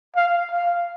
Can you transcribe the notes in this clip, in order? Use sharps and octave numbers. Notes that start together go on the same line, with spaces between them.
F5
F5